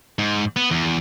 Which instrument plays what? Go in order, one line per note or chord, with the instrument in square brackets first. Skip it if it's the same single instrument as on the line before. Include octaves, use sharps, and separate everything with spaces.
[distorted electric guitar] G#2
B3
E2